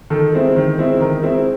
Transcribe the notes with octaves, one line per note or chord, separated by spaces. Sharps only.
D#3 A4
G#3 C4 E4
D#3
G#3 C4 E4
D#3 A#4
G#3 C4 E4